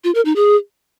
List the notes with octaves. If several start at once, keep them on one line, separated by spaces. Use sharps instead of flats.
F4
A#4
D#4
G#4